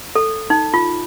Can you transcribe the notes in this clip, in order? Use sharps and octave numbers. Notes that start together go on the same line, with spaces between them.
A4
D#4
F4